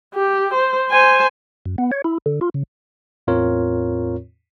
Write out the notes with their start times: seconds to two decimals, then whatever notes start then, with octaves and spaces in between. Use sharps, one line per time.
0.15 G4
0.54 C5
0.90 C5 G#5
1.66 F#2
1.78 B3
1.92 C#5
2.04 E4
2.26 D3
2.41 F4
2.54 C#3
3.27 E2 A2 C4 F4 A#4 C#5